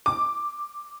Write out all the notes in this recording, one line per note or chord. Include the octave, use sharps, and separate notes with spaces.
D6